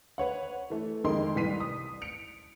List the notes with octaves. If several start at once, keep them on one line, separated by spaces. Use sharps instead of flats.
B4 C#5 F#5
E3 A3
F2 D#3 G#3 A#3 A#4 C6
C2 E3 B4 B6 C7 D#7
D#6
C#7 D7 F7